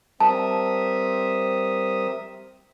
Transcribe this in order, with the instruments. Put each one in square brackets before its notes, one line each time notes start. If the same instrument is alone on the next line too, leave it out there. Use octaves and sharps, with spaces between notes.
[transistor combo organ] G3 A#4 D#6 [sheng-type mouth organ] C4 E5 [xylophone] A5